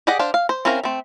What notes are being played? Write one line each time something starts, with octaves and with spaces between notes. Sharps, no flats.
G4 G#4 D5 D#5 F#5
D4 C5 F5
F5
C5
C4 C#4 E4 A#4 F5
A3 C4